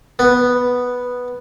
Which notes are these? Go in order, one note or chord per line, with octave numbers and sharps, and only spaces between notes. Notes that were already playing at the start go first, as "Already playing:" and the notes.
B3